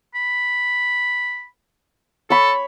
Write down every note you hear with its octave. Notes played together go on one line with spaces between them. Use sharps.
B5
A4 C#5 B5